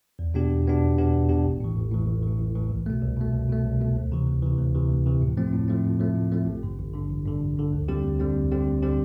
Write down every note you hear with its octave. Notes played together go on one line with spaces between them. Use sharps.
E2
B2 B3 D4 G4
E2
B2 B3 D4 G4
E2
B2 B3 D4 G4
E2
B2 B3 D4 G4
A1
A2 E3
A1
A2 E3
A1
A2 E3
A1
A2 E3
C2
B2 A3
C2
B2 A3
C2
B2 A3
C2
B2 A3
D2
C3 E3
D2
C3 E3
D2
C3 E3
D2
C3 E3
A2
F3 A3 C4
A2
F3 A3 C4
A2
F3 A3 C4
A2
F3 A3 C4
A1
G2 D3
A1
G2 D3
A1
G2 D3
A1
G2 D3
D2
D3 G3 C4 G4
D2
D3 G3 C4 G4
D2
D3 G3 C4 G4
D2
D3 G3 C4 G4